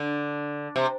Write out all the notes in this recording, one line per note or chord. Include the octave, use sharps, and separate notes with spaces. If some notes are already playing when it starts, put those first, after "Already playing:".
Already playing: D3
C3